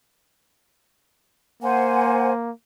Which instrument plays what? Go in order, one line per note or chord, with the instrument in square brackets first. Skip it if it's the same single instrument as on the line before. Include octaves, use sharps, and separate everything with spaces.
[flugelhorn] A#3 [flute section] C5 F#5 G#5